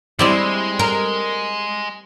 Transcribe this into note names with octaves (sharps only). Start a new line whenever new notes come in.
G3 G#3 C4 E4 D5
A#4